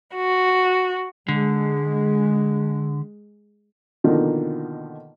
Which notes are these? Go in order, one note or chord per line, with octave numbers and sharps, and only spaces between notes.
F#4
D3 G#3
B2 D3 D#3 F3 A#3